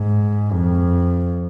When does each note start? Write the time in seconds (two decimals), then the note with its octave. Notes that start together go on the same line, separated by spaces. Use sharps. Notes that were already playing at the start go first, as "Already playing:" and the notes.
Already playing: G#2
0.52 F2